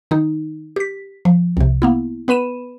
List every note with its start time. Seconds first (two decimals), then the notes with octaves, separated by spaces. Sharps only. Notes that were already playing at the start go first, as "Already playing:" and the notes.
0.11 D#3 D#4
0.76 G4 B6
1.25 F3
1.57 C2 C3
1.82 A#3 B3 E4
2.28 B3 B4 B5 D#7 E7